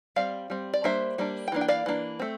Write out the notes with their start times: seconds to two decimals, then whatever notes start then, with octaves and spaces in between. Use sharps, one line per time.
0.16 G3 C4 D5 F5
0.50 G3 C4
0.74 D5
0.84 G3 A#3 D4 C5 E5
1.18 G3 A#3 D4
1.48 G5
1.52 E3 A#3 D4
1.61 G5
1.68 D5 F5
1.86 E3 A#3 D4
2.19 A3 C4